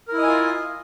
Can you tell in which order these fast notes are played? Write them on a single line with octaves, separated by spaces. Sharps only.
A#4 E4 D#5 G#5 F4